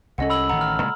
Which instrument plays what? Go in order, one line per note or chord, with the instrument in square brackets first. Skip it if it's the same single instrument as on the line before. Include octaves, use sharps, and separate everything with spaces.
[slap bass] C2 C#4 [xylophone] A4 D#5 F#5
[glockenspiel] B5 E6 F#7
[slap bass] A1 D#3 [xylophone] F#5 [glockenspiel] A#5
[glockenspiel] F6
[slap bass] A#2 C#3 G#3